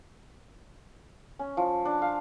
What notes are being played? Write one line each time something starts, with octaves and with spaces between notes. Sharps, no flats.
C#4
F3
D4
F5